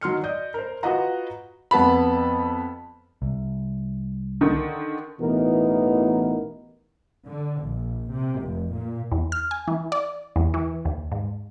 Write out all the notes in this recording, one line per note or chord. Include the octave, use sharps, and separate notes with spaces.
D#3 F#3 C6 F6 C#7
D5 D#5 G6
A#4 C5
F4 F#4 B4 D#5 F#5 A#5
F2 B3 A5 B5
C2
D3 D#3
A1 B2 E3 B3 D#4 A#4
D3
A#1
C3
F1
A#2
E2
F6
G#5
E3
D5
E2
E3
D#2
G#2